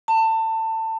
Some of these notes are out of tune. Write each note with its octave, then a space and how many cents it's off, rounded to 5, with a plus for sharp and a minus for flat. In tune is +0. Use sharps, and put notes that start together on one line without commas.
A5 +25